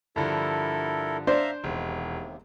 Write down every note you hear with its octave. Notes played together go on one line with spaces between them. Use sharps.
G2 D3 F3 E4 A4 A#4
D4 C5 E5 F5 A#5
E1 D#2 C3